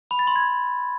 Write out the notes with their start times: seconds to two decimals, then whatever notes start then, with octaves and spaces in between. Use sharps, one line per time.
0.11 B5
0.19 A6
0.27 C6
0.36 G#6